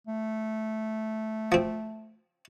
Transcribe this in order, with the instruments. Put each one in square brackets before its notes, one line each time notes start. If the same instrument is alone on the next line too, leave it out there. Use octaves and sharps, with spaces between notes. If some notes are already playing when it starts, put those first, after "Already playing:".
[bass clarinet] A3
[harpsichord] F3 C4